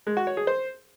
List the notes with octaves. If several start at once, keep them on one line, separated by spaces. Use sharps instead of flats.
G#3
F#4
C#5
G#4
C5